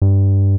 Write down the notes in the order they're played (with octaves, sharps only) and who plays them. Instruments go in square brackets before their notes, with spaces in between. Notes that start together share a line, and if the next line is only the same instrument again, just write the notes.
[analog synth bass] G2